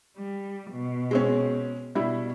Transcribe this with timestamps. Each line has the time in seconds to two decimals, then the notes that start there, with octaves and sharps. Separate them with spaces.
0.17 G3
0.71 B2
1.11 G#3 C4 C#4
1.95 B2 G3 E4